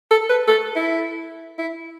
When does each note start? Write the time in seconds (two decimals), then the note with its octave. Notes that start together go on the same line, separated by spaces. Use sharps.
0.11 A4
0.29 B4
0.48 A4
0.76 E4
1.58 E4